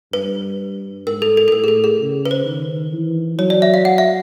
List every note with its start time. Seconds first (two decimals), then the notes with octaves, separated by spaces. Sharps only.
0.13 G2 B4
1.06 G#2 A#4
1.22 A4
1.37 A4
1.48 A4
1.52 A2 A#4
1.64 G#4
1.68 A4
1.84 G#4
2.00 C#3
2.25 B4
2.31 C5
2.45 D#3
2.93 E3
3.39 F#3 C#5
3.50 D5
3.62 E5
3.74 F5
3.85 F#5
3.98 E5